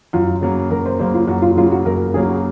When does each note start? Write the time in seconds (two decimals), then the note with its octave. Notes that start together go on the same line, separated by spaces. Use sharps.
0.13 F#2 F4
0.41 C#3 F#3 A#3
0.70 F#2 A#4
0.86 C5
0.99 C#3 F#3 A#3 C5
1.14 F4
1.28 F#2 F#4
1.42 F4
1.56 C#3 F#3 A#3 F4
1.71 F#4
1.85 F#2 A#4
2.14 C#3 F#3 A#3 G#4
2.29 F#4